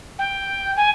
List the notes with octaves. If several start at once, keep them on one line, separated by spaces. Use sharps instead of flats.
G5
G#5